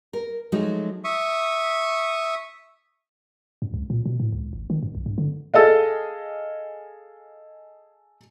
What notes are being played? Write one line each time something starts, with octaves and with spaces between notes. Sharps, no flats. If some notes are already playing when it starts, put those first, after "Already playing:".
A#4
F3 F#3 G#3 A3 D#4 F#4
E5 C#6 D#6
F#2
C#2
A#2
B2
A2
C#2
G#1
D#3
F#2
B1
G2
D3
G#4 A4 D#5 F5